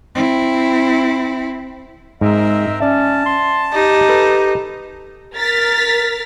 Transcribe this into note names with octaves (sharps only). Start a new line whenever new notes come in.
C4 E4
G#2 C4 A#4 D#5 E5
C#4 D5 E5 A5
C6
D#4 G4
A4 B4
A#4 F6 A6 B6